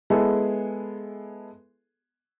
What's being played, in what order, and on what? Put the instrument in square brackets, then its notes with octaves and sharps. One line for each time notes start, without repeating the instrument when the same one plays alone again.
[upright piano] G#3 B3 E4 G#4 A4